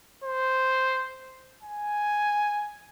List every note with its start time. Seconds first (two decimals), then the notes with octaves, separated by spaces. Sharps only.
0.24 C5
1.63 G#5